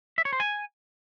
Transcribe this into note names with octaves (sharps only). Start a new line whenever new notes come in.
E5
C#5
C5
G#5